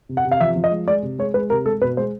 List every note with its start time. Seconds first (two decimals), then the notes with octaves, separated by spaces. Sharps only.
0.09 C3
0.17 F#5
0.25 C3
0.32 F5
0.41 F3 E5
0.56 F3
0.64 D#5
0.71 G#3
0.87 G#3 D5
1.03 C3
1.19 G#3 C#5
1.34 G#3 B4
1.50 C3 A#4
1.66 G#3 A4
1.81 B2 B4
1.97 G#3 C5